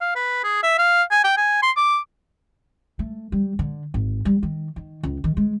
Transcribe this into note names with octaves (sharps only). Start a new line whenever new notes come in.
F5
B4
G#4
E5
F5
G#5
G5
G#5
C6
D6
A3
G3
D3
G#1
G3
D#3
D#3
C#2
D#3
G#3